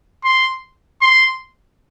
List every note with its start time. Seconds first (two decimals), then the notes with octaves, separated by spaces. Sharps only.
0.24 C6
1.02 C6